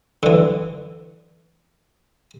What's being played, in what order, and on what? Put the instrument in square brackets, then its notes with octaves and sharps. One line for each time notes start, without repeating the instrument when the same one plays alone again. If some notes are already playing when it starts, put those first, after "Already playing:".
[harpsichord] D3 E3